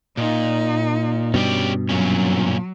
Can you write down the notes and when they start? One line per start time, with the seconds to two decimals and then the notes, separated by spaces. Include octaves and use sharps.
0.17 A#2 D#4
1.34 G2 B2 C#4 G4 D5
1.89 F#2 A#2 F#3 C#4